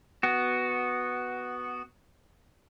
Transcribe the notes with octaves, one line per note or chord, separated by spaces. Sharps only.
B3 F#4